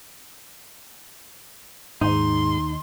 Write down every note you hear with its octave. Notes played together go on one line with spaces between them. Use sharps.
D#2 G#2 D#4 C6